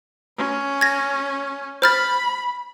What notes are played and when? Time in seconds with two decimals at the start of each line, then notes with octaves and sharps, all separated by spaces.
0.37 C#4
0.81 G#6 A#6
1.82 C5 B5 F6 A6